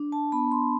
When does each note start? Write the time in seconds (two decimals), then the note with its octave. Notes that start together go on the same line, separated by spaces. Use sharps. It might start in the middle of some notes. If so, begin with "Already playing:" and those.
Already playing: D4
0.12 A5
0.32 B3 B5
0.52 C6